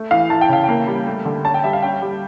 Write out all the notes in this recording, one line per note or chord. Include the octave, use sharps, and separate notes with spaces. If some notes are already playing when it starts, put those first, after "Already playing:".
Already playing: A3
E3 F5
E3 A5
G5
C#3 F5
A#3 G5
G3
A3
D3
C#4 A5
G5
G3 E5
F5
C#4 G5
G3